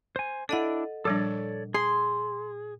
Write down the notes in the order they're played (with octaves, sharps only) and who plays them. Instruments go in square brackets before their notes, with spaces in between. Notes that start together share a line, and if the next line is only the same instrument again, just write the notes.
[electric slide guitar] C5 G#5
[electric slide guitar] D4 E4 [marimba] A4 D#5 F#5
[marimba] A#2 [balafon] F3 G3 D4 [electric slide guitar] A4 C#5 D5
[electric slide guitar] G#4 [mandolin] C6